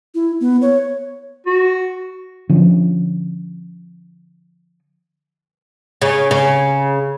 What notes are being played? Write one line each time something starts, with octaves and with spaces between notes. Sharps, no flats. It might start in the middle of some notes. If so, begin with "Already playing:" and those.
E4
B3
C#5
F#4
D3 F3 C#4
C#3
C#3